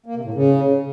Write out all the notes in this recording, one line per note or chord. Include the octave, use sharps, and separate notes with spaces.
A#3
C3
A2
C#3